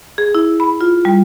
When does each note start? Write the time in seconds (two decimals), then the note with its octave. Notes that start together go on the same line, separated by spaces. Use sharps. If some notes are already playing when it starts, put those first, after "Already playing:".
0.18 G#4
0.35 E4
0.60 B5
0.81 F4
1.05 G3